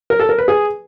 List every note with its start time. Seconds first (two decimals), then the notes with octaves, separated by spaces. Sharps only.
0.10 A#4
0.20 A4
0.29 A#4
0.38 B4
0.48 G#4